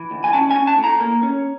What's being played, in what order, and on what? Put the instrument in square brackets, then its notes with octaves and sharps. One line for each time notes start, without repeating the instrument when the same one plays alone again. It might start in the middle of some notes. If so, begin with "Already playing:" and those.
Already playing: [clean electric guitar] E3
D2
G#5
C#4 A5
G#5
C#4
A5
A2
A#5
A#3
C#4